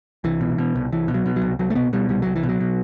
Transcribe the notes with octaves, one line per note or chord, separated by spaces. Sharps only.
C2 E3
B2
B2
C2
C2 E3
B2
F#3
B2
F#3
C2
C2 F#3
A3
B2 B3
B2 G3
C2 G3
C2 F#3
E3
B2
F#3
B2